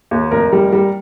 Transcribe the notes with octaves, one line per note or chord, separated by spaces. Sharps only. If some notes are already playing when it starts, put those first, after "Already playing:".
D#2
F1 A#4
G3
G3